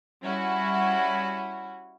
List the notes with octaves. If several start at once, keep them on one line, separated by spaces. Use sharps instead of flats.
G3 C#4 E4 F#4